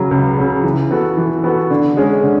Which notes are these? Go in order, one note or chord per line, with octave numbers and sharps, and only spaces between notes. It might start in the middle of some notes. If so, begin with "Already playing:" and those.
Already playing: C#3 F#3
C#2
C#3 F#3
E3
B3 F#4 A4
E3
B3 F#4 A4
D3
G#3 C#4
D3